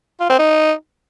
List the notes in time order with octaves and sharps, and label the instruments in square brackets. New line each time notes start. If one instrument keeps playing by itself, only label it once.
[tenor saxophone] F4
C4
D#4